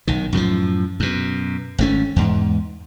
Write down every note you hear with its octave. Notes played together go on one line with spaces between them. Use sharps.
B1 D#3
F#2 A2 D3 F3
F#2 B2
G#1 A3 C#4
E2 G#2